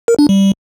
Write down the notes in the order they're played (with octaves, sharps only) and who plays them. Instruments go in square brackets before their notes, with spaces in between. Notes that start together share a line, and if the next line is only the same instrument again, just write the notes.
[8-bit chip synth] A#4
D4
G3